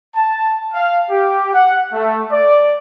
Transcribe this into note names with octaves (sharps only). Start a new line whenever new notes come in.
A5
F5
G4
F#5
A3
D5